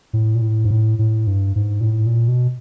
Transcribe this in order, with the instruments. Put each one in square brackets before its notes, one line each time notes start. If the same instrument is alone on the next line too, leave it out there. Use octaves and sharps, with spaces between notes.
[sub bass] A2
A#2
A2
G#2
A2
A2
G2
G#2
A#2
A2
A#2
B2